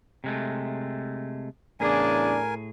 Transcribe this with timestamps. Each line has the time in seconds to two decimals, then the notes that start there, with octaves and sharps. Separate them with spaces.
0.24 C3 G#3 A3
1.80 E2 A2 C#3 D4 G#4 A#4 G#5